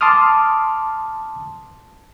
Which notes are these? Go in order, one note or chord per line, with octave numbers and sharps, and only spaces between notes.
A5 C6 D6 D#6 F6